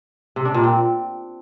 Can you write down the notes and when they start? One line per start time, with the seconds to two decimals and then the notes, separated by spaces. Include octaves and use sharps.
0.36 C3
0.45 D4
0.54 A#2
0.63 C4